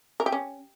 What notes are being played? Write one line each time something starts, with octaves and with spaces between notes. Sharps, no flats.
A#4
G4
C#4